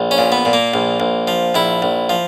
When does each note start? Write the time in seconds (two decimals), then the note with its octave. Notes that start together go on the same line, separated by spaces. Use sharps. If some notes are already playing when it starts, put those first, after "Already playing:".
Already playing: A#1
0.11 C#4
0.18 A#2
0.32 B3
0.45 A#2
0.53 A#3
0.74 A#1
1.00 A#1
1.28 F3
1.55 A#1 E4
1.82 A#1
2.09 F3